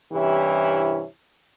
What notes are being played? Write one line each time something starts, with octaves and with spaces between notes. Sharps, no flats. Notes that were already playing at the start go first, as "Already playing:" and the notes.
G2 C3 E3 C#4 E4 G4